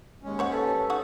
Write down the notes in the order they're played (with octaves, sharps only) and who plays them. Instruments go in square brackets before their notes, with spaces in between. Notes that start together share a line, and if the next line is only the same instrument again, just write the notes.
[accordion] D#2 C#4 [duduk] G#3
[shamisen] C5 C#5 F#5
[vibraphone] G4 B4 E6 [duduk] A4
[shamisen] D#4 C#5 F#5